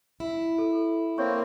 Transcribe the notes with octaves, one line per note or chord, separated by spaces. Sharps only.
E4
A4
A#3 C4 C#5 C#6